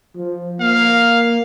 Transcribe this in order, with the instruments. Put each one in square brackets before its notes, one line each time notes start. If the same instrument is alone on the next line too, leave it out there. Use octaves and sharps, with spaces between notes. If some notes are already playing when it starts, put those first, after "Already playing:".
[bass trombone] F3
[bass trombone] A#3 [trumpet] F5